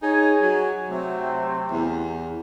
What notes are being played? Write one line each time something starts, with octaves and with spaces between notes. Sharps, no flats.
D#4 G#4 C#5 G#5
F#3
C3 F#3 A3 C4
E2